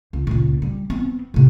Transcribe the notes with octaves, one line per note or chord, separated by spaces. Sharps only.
C#2
C#2 A#2
G3
B3 C4
A2 C3